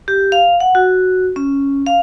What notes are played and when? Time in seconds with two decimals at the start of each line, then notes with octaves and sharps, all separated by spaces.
0.08 G4
0.32 F5
0.60 F#5
0.75 F#4
1.36 C#4
1.86 F5